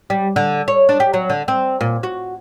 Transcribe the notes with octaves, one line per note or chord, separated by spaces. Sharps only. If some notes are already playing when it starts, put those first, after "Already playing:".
G3
D3
C#5
D4
G4
F#3
D3
C4
A#2
F#4